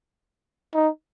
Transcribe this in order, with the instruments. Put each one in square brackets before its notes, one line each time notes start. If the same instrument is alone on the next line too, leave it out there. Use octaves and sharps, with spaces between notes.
[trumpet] D#4